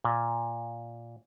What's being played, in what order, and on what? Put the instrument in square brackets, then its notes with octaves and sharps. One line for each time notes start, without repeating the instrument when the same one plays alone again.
[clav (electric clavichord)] A#2